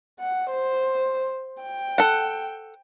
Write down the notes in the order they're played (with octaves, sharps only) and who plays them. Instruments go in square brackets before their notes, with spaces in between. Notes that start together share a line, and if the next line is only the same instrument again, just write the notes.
[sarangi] F#5
C5
G5
[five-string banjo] A4 F#5